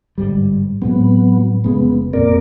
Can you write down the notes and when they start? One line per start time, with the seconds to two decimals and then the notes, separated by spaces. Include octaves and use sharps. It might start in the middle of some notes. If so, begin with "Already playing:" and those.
0.18 G1 G#2 G3
0.82 A2 F#3 G#3 B3 C4
1.64 F1 C#3 G#3 B3
2.13 F2 A#2 C4 A#4 D5